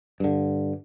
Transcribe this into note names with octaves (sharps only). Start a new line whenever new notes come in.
G2 D3